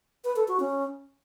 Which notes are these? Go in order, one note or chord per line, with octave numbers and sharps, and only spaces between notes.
B4
A4
F#4
C#4